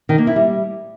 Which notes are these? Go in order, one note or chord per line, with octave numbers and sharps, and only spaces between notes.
D#3
A#3
E4
G3